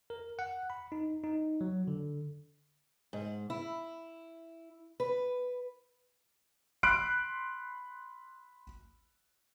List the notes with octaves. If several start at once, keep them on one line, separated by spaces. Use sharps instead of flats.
A#4
F#5
B5
D#4
D#4
F#3
D3
G#2
E4
B4
B5 C6 F#6 C7 D7